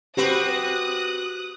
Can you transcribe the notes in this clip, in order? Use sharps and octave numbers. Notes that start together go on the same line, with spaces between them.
C4 F#4 G4 B4 D#6 F#6